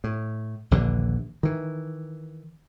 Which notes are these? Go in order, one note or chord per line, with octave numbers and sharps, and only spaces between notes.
A2
A#1 D#2 D3 E3
D#3 E3